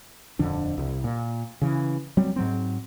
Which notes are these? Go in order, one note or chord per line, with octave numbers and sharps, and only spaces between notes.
D#1 F2 D3 D4
C2
A#2
C#3 E3
F#3 G3 C4
G#2 F#3 C4